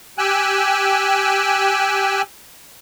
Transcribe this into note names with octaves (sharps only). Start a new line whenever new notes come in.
G4 G5 G#5 E6 F#6